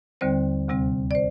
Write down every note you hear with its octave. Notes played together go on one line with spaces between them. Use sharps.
D#2 D3 G3 C4 C5
D2 C3 G3 C4
D5
C5